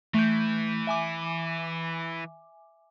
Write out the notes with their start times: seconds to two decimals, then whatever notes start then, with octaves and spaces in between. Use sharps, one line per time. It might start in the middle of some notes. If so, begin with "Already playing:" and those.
0.14 E3 A3 G6
0.87 E5 G#5 D6